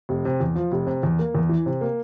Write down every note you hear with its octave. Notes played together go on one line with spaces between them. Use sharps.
F1
C3
E2
F3
F1
C3
E2
A#3
E2
E3
C3
A#3